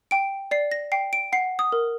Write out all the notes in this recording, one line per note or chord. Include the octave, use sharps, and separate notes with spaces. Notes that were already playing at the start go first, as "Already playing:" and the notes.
G5 D7
D5 C7
A#6
G5 C7
D7
F#5 C7
D#6
A#4